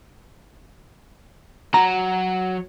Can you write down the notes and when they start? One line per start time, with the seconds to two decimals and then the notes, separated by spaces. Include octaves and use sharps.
1.74 F#3 A#5